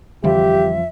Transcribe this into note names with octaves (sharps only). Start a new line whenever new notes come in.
F2 D3 E3 F3 G3 F4 G4 E5